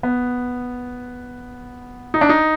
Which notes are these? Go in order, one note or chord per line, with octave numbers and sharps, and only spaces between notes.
B3
D#4
D4
D#4